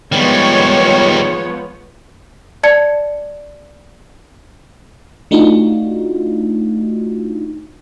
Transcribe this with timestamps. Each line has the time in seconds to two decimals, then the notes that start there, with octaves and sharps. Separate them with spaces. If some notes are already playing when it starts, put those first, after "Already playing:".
0.12 D#3 F3 G3 G#3 B3 C#5
2.63 D5 A5 G#6 C#7
5.31 A3 D4 D#4 F4 F#4